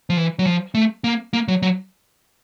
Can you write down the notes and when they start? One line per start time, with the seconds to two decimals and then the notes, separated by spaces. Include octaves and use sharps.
0.10 F3
0.17 E3
0.39 F#3
0.46 F3
0.75 A3
1.04 A#3
1.33 A#3
1.48 F#3
1.62 F#3